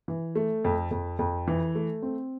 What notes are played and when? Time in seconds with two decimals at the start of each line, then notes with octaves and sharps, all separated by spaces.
0.08 E3
0.35 A3
0.64 F2
0.91 F2
1.19 F2
1.48 E3
1.75 A3
2.02 C4